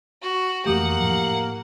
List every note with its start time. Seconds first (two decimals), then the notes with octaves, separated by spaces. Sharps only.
0.22 F#4
0.66 F2 E3 A3 A#3 G4 F#5 D#6
1.00 A2 F3